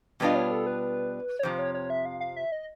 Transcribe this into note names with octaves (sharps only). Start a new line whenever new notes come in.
B2 G3 B3 D4 F4 D#5
C#5
A4
B4
C#5
F2 C3 F3 C5
C#5
C#5
E5
F5
F5
E5
D#5